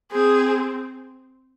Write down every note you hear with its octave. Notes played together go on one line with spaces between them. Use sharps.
C4 G#4